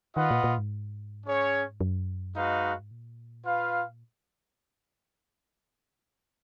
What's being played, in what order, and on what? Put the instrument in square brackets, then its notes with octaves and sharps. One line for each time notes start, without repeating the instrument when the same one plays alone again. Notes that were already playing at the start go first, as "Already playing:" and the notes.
[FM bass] D#3 [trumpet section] F4 B4 D#5 F#5
[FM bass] A#2
A#2
G#2
[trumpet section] C#4 G#4 C#5
[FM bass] F#2
[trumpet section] G#3 D#4 F#4 B4 F5
[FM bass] G#2
A#2
[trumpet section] F4 B4 F5